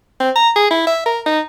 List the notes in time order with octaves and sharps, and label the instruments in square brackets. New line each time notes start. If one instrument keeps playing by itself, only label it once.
[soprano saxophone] C4
A#5
G#4
E4
E5
A#4
D#4